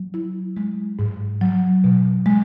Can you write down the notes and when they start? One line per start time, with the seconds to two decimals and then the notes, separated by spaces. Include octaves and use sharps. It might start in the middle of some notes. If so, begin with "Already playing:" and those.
Already playing: F#3
0.14 E4
0.57 G#3
0.99 G#2
1.41 F#3
1.84 B2
2.26 G#3